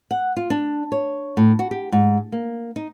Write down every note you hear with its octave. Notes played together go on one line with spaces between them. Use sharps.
F#5
F4
D4
C#5
A2
F#4
G4
G#2
A#3
D#4